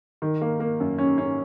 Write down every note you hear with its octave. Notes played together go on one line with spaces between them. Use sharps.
D#3
A#3
A#3
F#2
C#4
C#4